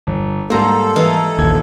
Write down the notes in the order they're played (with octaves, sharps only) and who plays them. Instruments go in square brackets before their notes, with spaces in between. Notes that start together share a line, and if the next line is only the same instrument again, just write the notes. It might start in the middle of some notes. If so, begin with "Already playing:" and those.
[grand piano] G1
[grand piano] G#2 G3 A#3 [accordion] A4 [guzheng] C5 A#5
[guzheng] E3 D#4 F5
[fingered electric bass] A#1 D#2 [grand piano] G#6